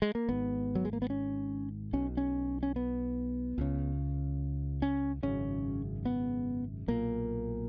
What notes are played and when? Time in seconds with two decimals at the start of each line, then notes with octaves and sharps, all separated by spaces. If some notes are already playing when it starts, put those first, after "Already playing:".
0.02 G#3
0.15 A#3
0.28 G#1 G#2 B3
0.75 F#3
0.85 G#3
0.93 A#3
1.02 B3
1.10 C#4
1.93 B1 B2 C#4
2.17 C#4
2.63 C#4
2.76 B3
3.58 C#2 C#3
4.82 C#4
5.23 G#1 F#2 C#3 C#4
6.05 B3
6.88 B1 A#2 A#3